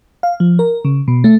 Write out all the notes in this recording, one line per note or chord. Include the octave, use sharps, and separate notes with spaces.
F5
F3
A#4
C#3
B2
A3